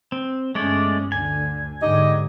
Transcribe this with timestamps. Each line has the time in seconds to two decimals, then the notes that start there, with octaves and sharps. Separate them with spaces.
0.12 C4
0.55 G1 G#3 A3 C#4 D5
1.12 D2 D3 G#5
1.82 G#2 D3 D#4 G4 D#5